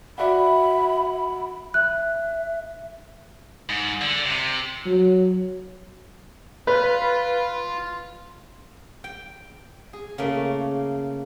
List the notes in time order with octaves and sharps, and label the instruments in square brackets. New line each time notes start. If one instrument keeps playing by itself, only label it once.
[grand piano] F#4 D5 F#5 [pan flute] E5 [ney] B5
[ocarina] E5 [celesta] F#6
[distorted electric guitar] G#2
D3
C3
[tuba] F#3
[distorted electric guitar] F4 [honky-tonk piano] B4
[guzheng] G5
G#4
C#3 A3 A#3